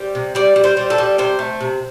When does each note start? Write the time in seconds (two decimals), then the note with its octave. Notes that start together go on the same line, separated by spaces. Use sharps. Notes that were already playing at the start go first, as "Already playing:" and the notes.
Already playing: G3 C5
0.15 C3
0.35 G3 D5
0.56 G3
0.64 C5
0.77 G3
0.90 A4
0.98 G3
1.18 C3 C5
1.39 A3
1.61 C3